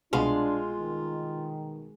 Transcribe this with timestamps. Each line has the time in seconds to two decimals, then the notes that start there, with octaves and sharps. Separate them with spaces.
0.13 C2 B2 G#3 D4 F4 F5
0.78 D#3